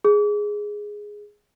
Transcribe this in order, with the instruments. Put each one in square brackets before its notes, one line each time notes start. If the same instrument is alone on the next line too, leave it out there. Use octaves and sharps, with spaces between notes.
[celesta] G#4